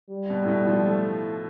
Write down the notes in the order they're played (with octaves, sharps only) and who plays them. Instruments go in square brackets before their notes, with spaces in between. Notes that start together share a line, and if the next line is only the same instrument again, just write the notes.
[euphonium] G3
[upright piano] B2
A2
B2
F3
A3